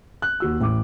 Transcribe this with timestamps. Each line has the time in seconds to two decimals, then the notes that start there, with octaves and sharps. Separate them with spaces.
0.22 F#6
0.40 D#2 F#4 E6
0.61 A1 D6